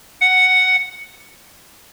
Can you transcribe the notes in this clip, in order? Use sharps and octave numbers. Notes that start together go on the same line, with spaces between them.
F#5